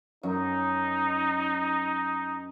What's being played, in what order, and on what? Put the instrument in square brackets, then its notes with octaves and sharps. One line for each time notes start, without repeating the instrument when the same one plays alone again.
[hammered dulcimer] F#2 [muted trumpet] D#4